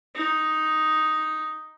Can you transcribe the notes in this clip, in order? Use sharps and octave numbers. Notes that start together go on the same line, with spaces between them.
D#4